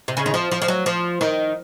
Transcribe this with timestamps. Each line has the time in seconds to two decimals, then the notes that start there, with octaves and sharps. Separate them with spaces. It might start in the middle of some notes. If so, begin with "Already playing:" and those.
0.08 C3
0.17 C#3
0.26 D#3
0.34 F3
0.51 F3
0.62 F3
0.68 F#3
0.86 F3
1.21 D#3